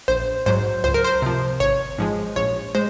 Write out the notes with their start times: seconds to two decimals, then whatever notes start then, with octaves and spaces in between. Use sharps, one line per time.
0.08 A#1 C5
0.46 G#2 F#3 C5
0.84 C#2 C5
0.94 A#4
1.04 C5
1.22 C3 F3
1.60 G#1 C#5
1.98 G#2 F3 G#3
2.36 A#1 C#5
2.75 G#3 C5